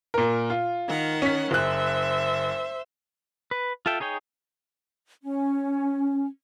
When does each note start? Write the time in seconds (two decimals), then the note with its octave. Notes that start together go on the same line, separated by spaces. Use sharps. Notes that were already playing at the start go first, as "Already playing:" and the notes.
0.14 A#2 A#4
0.50 F4
0.88 D#3 F#5
1.22 C#4 B6
1.51 F#1 C5 E5 F#6
3.51 B4
3.86 F4 A4 E5 G5
4.00 D#4 G#4 C#5 G5
5.22 C#4